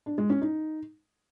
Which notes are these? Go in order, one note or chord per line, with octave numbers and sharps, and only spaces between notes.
D4
G#3
C#4
D#4